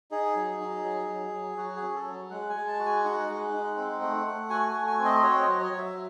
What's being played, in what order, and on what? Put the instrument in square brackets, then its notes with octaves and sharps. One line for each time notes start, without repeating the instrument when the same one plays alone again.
[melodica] D#4 G#4
F#3
D#4
F#3
F#3
F#3
F#3 F#4
G#4
C#4
A4
F#3
G#3 F#5
G#5
G#3
A5
F#4
G#5
D#4 F#5
G#3
D#4
C4
A3
A3
F#4 G#5
G#5
A3
G#5
C4
D#5
F#4 C#5
D#5
F#3
C#5
F#3
E5